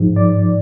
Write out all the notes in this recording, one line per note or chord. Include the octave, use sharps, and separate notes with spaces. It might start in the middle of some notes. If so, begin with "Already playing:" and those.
Already playing: G#2 F3
D5